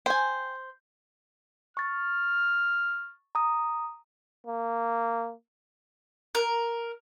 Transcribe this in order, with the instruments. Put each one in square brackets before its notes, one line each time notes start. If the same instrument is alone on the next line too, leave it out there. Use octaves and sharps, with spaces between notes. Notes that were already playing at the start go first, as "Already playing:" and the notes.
[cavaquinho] C5 [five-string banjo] G5 G#5
[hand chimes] C#6 A6 [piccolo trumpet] F6
[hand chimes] A#5 D#6
[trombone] A#3
[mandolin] A#4